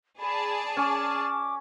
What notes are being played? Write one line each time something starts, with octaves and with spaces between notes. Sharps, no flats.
G#4 D5 A5 B5
C#4 D6